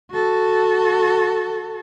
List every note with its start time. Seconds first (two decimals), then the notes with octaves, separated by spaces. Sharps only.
0.11 F#4 A4